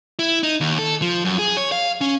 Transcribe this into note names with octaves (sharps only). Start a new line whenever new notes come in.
E4
D#4
D#2
A4
F3
F#2
G#4
C#5
F5
C#4